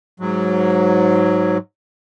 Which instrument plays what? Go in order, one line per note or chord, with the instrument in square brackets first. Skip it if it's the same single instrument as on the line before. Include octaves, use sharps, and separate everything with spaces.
[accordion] G#2 F#3